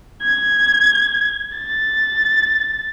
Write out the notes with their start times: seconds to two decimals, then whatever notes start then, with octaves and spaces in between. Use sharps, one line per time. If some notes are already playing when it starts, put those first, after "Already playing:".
0.22 G#6
1.58 A6